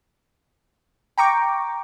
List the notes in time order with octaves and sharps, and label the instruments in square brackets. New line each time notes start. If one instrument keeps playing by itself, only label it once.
[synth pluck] G5 A#5 C#6 D6